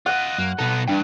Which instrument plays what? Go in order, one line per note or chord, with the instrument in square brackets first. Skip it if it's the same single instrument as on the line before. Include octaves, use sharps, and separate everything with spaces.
[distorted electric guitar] F4 D#5 [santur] F#5
[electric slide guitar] F#2 [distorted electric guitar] A#3
[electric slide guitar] B2 A4 [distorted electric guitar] B3 D#4
[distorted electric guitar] G2 E3 [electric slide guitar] G3 D4 G5